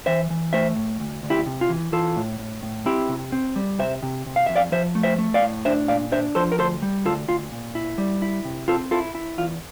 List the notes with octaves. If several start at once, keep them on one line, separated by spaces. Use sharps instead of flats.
E3 C5 E5
E3
A3 C5 E5
A2
D2
D2
E4 G4
C3
F4
E3
E3 F4 A4
A2
A2
A2
C4 E4 G4
C3
C4
G3
C3 C5 E5
C3
C3
F5
F2 E5
D5 F5
F3 C5 E5
A3
C5 E5
A3
D5 F5
A2
D4 C5 E5
A#2 D5 F5
D4 C5 E5
F3 A4 C5
A#4
D2 A4 C5
G3
D2 F4 A4
D2 F4
A#2
E4
G3
E4
C3
C4 F4 A4
E4 F4 A4
E4
E2 F4